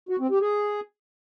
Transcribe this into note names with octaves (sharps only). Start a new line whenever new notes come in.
F#4
C4
G4
G#4